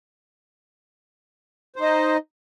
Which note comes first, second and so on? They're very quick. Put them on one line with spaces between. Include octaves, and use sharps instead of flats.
C5 D#4 D#5